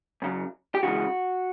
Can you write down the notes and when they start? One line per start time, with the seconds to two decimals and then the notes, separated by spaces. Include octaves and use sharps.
0.22 F#2 C#3 F#3
0.75 G4
0.83 D#2 C#3 E3 G#3 F#4